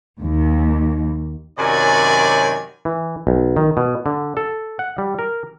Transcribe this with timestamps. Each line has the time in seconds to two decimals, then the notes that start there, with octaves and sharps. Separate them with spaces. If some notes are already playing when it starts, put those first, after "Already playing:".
0.20 D#2
1.58 F#2 C3 D#3 F#3 D5 G#5
2.85 E3
3.27 B1
3.56 D#3
3.77 B2
4.06 D3
4.37 A4
4.79 F#5
4.98 G3
5.19 A#4